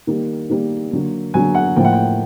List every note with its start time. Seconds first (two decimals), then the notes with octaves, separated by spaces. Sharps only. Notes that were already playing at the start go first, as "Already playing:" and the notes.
0.07 D#3 G3 A#3
0.50 D#3 G3 A#3
0.92 D3 F#3 A#3
1.34 D3 F#3 A#3 G#5
1.55 F#5
1.76 A2 F3 A#3 G5
1.84 F#5
1.93 G5